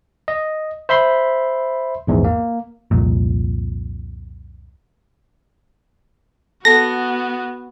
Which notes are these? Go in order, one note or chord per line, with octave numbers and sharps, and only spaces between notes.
D#5
C5 E5 B5 C6
A#1 E2 G#2
A#3
C2 F2 A#2
B3 F#4 A4 A#6